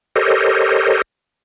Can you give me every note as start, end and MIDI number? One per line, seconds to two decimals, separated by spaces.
0.16 1.02 67
0.16 1.02 69
0.16 1.02 70
0.16 1.02 72
0.16 1.02 73
0.16 1.02 75